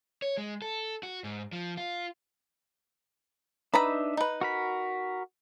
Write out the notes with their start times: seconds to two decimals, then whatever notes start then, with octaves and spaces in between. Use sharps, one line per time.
0.22 C#5
0.38 G#3
0.62 A4
1.03 F#4
1.24 G#2
1.53 F3
1.77 F4
3.74 D4 D#4 B4 E5 A#5 B5
4.17 D#4 B4
4.41 F#4 A#4 B5